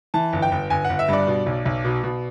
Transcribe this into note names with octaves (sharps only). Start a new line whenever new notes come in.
E3 A5
G1
G5
G1
G1 G#5
F#5
G1
E5
G2 D5
B2
B1
B1
B2
B2